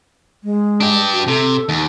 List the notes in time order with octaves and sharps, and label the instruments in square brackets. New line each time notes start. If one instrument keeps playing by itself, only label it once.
[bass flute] G#3
[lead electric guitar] D4 G4
[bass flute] F#4
[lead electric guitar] C3 [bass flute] A4
[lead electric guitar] D#2